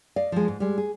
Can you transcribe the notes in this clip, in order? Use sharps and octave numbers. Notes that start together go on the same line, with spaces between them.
D5 D#5 F5
F3 G#3
G#2
G3 G#3
G#4